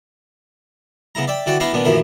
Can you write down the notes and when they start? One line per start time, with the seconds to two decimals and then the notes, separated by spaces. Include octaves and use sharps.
1.15 C#3 B3 E4 A#5
1.27 D5 E5 G5
1.46 D3 E3 F#4 D5 G5
1.60 B3 D4 E4 F5 G5 A#5
1.73 A#2 D#3 B3 D4
1.85 A1 F#2 A#2 D#3 E4 A#4